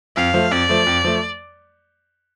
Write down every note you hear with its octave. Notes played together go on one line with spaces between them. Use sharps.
F2 F5
F3 A3
F2 D5
F3 A3
F2
F3 A3